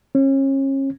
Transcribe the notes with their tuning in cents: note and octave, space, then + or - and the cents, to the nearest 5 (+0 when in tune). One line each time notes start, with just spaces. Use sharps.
C#4 -35